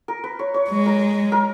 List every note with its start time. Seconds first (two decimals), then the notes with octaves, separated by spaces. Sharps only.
0.08 A#4
0.24 B4
0.39 C#5
0.54 C#5
0.70 G#3
0.86 A#4
1.32 A#4